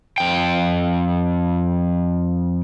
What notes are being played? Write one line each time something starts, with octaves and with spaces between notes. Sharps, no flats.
F2 G5